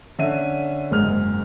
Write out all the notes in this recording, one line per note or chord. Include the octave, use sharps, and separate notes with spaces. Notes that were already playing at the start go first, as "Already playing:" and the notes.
D3 C#4 E5 D#7
F#1 G#2 G#4 F6